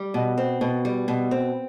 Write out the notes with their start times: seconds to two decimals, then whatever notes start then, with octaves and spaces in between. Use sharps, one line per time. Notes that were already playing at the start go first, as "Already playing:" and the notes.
Already playing: G3
0.14 B2
0.38 C4
0.61 B2
0.85 G3
1.08 B2
1.31 C4